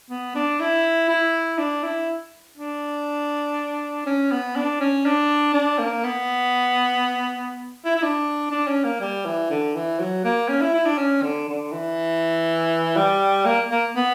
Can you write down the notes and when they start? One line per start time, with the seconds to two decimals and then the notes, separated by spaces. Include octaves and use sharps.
0.10 B3
0.35 D4
0.60 E4
1.09 E4
1.58 D4
1.83 E4
2.58 D4
4.06 C#4
4.32 B3
4.56 D4
4.80 C#4
5.06 D4
5.54 D4
5.79 A#3
6.04 B3
7.85 E4
7.96 E4
8.02 D4
8.51 D4
8.67 C#4
8.84 A#3
9.00 G3
9.25 E3
9.50 D3
9.76 E3
10.00 F#3
10.25 A#3
10.49 C#4
10.62 E4
10.74 E4
10.86 D4
10.98 C#4
11.23 D3
11.48 D3
11.72 E3
12.97 G3
13.45 A#3
13.71 A#3
13.96 B3